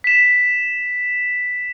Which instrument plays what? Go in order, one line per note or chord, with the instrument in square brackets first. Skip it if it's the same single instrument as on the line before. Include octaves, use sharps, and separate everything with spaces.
[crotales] B6 E7